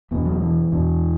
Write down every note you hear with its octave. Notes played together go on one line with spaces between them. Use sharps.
E2 B2 B3
F#3
E3
E2 B2